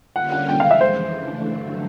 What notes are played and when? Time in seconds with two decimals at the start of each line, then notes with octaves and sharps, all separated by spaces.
0.15 D3 G3 A#3 C#4 F4 F#5
0.32 F#5
0.48 F2 C3 D#3 G#3 G5
0.60 F5
0.71 E5
0.81 F2 C#3 E3 C5
1.14 E3 A3 D4
1.47 G2 D3 F#3 A3